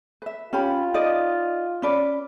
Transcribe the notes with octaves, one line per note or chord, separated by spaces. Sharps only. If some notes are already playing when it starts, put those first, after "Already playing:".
B4 E5
C#4 F4 G4 B5
D#4 D5 D#5
C#4 B4 D5